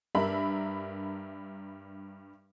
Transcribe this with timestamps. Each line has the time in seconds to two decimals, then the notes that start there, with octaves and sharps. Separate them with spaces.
0.15 G2 D4 A#4 E5 B5